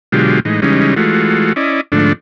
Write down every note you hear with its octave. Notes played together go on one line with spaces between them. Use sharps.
B2 D3 F#3 G#3 F4 G4
A2 E3 G#3 D#4
C#3 E3 G3 G#3 C#4 D#4
E3 G#3 A3 F4 F#4
C#4 E4 D5 D#5
G#2 D3 F3 A3 D4